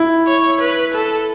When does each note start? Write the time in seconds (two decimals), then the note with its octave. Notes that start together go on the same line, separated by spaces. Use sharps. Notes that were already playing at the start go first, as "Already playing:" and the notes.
Already playing: E4
0.27 C#5
0.61 B4
0.94 A4